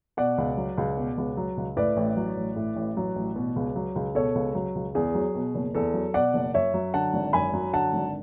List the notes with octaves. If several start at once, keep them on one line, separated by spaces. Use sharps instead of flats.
B2 D5 F#5
C#2
F#3
C#2
B2
C#2
F#3
C#2
A2 B4 D5
A1
F#3
A1
A2
A1
F#3
A1
B2
C#2
F#3
C#2
B2 A4 C#5
C#2
F#3
C#2
E2 G#4
F#3
B2
F#1
E2 A4
F#3
B2 D5 F#5
F#1
F#2 C#5 E5
F#3
D3 F#5 A5
G#1
F#2 G#5 B5
F#3
D3 F#5 A5
G#1